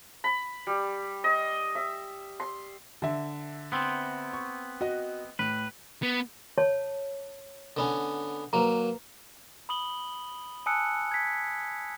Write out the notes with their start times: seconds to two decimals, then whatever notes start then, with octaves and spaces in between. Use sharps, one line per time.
0.24 B5
0.67 G3
1.24 D#5
1.75 E5
2.40 C6
3.02 D3 E5
3.72 B3 C4
4.33 C#6
4.81 F#4 D#5
5.39 A2 B4
6.03 B3
6.58 C#5 A5
7.77 D3 B3 C#4
8.53 F#3 A#3 B4 A#5
9.69 B5 D#6 F#7 G7
10.66 G#5 A5 D#6 E6 F#6 C#7
11.11 G#6 B6